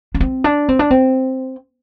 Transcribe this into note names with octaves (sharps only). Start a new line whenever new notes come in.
D4
C4
D4
C4
D4
C4